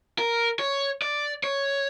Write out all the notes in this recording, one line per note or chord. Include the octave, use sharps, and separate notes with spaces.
A#4
C#5
D5
C#5